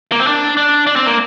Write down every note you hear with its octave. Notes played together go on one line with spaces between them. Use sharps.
A#3
C4
D4
D4
D4
C4
A#3